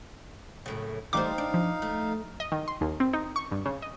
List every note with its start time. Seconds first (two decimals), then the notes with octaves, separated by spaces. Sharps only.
0.66 F#2 A2 C#3
1.13 A1 G3 A3 D#4 C5 F5 D6
1.38 D4
1.54 F3
1.82 A3
2.40 D#5
2.52 D#3
2.68 C6
2.81 D#2
3.00 C4
3.13 D#4
3.36 C#6
3.51 G2
3.66 C#3
3.82 D#5